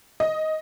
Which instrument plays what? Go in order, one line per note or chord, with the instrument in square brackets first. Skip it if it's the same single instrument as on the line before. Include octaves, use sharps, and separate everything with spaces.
[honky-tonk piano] D#5